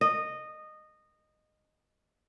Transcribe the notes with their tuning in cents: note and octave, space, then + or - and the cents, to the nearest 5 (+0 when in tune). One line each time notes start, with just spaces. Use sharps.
D#5 -15